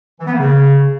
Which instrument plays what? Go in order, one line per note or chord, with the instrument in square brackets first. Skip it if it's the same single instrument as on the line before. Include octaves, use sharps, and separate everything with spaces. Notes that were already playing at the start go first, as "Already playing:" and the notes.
[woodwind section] E3
B3
A#3
C#3